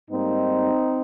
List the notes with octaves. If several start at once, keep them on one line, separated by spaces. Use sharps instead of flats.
G#2 G3 A#3 C4 D#4